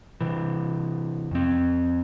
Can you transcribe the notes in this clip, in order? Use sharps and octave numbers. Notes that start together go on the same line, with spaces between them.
C3 E3
F2 C4